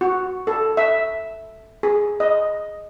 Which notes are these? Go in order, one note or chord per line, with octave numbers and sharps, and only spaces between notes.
F#4
A4
E5
G#4
D#5